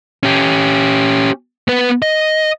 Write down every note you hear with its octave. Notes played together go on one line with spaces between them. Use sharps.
C#4 G4
B3 B4
D#5